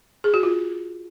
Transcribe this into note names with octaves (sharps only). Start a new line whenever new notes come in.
G#4
F#4
F4